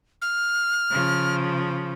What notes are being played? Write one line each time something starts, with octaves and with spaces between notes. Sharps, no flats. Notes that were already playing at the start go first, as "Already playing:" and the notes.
F6
C#3 F3